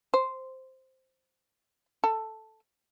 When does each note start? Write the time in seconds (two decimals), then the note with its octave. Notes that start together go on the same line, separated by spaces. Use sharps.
0.14 C5
2.04 A4